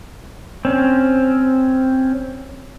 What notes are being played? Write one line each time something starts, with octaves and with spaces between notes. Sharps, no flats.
C4 C#4